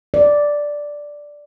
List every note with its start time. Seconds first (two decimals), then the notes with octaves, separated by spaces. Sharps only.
0.14 D5